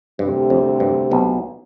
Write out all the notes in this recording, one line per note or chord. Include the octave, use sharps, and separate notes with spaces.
D2 G2 C3 G3
F2
G2
B1 B2